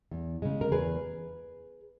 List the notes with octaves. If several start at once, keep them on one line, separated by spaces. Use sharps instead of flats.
E2
C#3 G#3
A#4
E2 G#4 B4